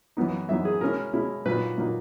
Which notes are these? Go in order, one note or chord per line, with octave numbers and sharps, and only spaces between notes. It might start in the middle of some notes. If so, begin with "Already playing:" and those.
F#2 E3 B3 D#4
F#2 E3 B3 D#4 E5
G#4
B2 G#3 C#4 E4 A#4
B2 G#3 C#4 E4
A#2 F#3 A#3 D#4 B4
A#2 F#3 A#3 D#4